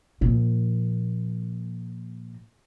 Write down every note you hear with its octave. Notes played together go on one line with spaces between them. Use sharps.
A#2 F3